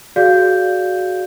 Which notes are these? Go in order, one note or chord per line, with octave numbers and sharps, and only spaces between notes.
F#4 G#4 D5 F5 G6